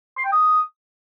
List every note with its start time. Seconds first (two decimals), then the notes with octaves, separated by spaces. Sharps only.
0.17 C6
0.25 G5
0.32 D#6